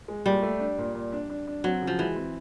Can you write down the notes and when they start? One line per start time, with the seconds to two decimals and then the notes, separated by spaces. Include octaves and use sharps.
0.08 G#3
0.26 A#2 G3
0.42 A3
0.60 D4
0.78 A#2
0.95 A#2
1.12 D4
1.30 D4
1.47 D4
1.64 F#3 C4
1.82 C#3
1.87 F3
1.99 E3 G#3
2.16 C4